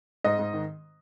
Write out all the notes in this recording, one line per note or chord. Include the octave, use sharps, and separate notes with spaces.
G#2 D#5
G#2
D#3